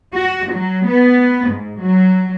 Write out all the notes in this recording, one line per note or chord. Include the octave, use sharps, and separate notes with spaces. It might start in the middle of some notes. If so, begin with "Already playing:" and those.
F#4
F#3
B3
G#2
F#3